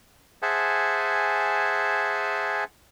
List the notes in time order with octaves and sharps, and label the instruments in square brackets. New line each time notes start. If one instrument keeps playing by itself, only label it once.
[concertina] G#4 C5 E5 F#5 G#5 A5